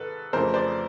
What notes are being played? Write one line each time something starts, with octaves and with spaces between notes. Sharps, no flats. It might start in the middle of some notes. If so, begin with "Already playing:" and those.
Already playing: G#2 D#3 A4 B4
F2 C#3 E3 A3 A#4 C5
C5 D5